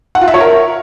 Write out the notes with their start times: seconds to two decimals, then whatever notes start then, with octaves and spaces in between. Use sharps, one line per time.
0.15 F#5
0.21 F4
0.28 E5
0.34 C#5
0.40 A#4